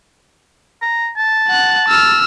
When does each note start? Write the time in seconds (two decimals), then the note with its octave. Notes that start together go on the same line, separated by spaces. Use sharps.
0.82 A#5
1.17 A5
1.48 F#5 F#6
1.88 E6 F6